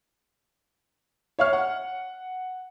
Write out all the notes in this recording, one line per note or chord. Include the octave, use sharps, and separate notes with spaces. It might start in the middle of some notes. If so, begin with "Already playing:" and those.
C#5 E5 F5 C#6 F6
F#5